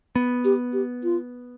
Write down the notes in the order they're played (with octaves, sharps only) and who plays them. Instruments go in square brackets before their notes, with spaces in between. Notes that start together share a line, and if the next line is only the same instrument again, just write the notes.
[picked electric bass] B3
[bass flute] G4
G4
F4